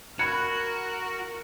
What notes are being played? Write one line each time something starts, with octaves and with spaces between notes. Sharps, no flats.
F#4 A#4 B5 F#6 G#6 C#7